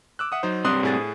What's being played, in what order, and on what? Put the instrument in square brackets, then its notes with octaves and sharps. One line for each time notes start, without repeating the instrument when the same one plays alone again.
[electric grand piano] D6 E6 F#6
E5 F#5 D#6
F#3 D#4 C5
[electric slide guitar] G3 C4 D4 [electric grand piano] C6 D#6 F#6
[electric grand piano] A2 G#4 A6